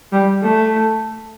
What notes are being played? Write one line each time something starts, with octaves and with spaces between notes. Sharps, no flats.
G3
A3